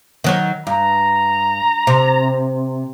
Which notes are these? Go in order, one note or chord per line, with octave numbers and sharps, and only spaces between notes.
D#3 F#3 C#5
G2 A#5
C3